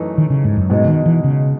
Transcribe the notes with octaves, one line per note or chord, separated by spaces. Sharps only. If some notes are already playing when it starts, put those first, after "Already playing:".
Already playing: F#2 E3 A3 D#4
D#3
C#3
G#2
F#2
G#2 B2 G#3 D#4
C#3
D#3
E3
C#3